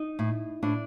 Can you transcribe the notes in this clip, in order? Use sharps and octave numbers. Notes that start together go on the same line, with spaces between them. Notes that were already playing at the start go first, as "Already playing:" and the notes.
Already playing: D#4
A2
A2 D4